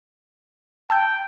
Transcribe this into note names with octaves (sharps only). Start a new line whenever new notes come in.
G5 A5 E6 G6